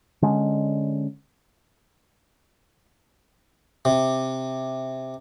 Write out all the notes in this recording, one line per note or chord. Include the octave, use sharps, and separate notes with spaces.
D3 G#3 C#4
C3